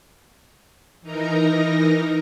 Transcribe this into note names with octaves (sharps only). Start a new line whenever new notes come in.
E3 D#4 A#4 A#5